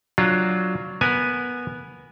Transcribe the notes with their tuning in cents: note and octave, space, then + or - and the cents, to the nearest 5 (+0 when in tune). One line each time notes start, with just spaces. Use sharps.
F#3 +0 D4 +0 F4 +0
B3 -10 A#4 -15 G#5 +0